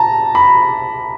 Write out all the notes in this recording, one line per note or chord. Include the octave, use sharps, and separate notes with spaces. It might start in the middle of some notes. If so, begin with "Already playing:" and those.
Already playing: A5 A#5
B5